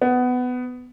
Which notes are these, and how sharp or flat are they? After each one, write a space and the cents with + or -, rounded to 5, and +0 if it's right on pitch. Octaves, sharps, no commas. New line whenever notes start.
B3 +15